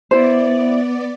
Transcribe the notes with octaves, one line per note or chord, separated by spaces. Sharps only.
B3 E4 C5 D5